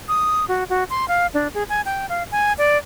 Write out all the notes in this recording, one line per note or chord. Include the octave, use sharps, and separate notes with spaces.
D#6
F#4
F#4
C6
F5
D4
G#4
G#5
G5
F5
G#5
D5